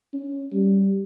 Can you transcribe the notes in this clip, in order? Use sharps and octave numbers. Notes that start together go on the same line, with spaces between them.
C#4
G3